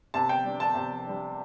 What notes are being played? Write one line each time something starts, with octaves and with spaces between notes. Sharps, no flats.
C3 A5
G5
G3 D4
A5
C3
G3 D4